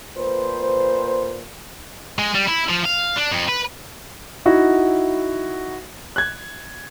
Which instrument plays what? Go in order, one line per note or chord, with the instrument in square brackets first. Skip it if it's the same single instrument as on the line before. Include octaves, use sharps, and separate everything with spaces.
[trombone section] A#2 B4 C5
[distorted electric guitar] G#3
G3
E4
F3
F5
D4
F2
B4
[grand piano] D#4 E4 F#4 F#5
F#6 G#6